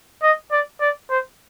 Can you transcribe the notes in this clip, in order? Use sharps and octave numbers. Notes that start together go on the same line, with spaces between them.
D#5
D5
D5
C5